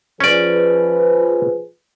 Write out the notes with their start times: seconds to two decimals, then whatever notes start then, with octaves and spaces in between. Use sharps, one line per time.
0.20 F3 C#4 G#4 B4 D5